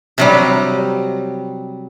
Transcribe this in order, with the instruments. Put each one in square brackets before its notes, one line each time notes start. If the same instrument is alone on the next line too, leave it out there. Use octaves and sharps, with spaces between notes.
[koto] C3 F#3 G3